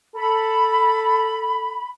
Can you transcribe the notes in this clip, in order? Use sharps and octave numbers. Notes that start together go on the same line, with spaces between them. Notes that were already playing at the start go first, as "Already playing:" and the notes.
A4 B5